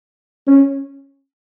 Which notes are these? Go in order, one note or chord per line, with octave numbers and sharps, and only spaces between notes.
C#4